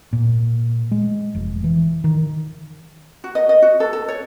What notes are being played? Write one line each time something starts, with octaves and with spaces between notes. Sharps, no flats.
A#2
G#3
F1
E3
D#3
F#4
D#5
D#5
F#4
A4
A4
C#5